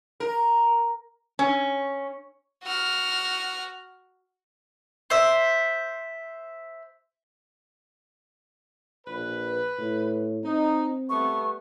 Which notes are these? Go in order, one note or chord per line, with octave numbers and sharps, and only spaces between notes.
A#4
C#4
F#4 F6
C5 E5
A#1 B4
A2
C4 D#4
G3 A3 B3 C#6